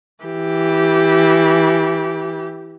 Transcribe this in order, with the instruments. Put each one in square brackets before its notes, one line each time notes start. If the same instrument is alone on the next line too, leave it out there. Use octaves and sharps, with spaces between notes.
[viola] E3 G4